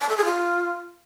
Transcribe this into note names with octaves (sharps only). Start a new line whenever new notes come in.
A5
A4
G#4
F4